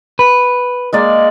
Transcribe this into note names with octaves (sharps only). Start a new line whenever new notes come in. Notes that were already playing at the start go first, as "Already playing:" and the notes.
B4
G#3 A#3 D5